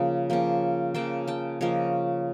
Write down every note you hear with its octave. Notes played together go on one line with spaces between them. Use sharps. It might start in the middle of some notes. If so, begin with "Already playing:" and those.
Already playing: C#3 F3 A#3
C#3 F3 A#3
C#3 F3 A#3 G5 A5
G5 A5
C#3 F3 A#3 C#5 D#5